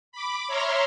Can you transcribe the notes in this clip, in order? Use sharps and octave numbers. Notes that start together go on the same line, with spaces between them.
B5 D6
C#5 E5 A#5 C6 F6